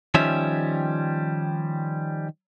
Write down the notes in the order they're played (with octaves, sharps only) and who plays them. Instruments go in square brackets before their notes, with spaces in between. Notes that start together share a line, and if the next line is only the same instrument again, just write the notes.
[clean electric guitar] D#3 F3 G3 C#4 E5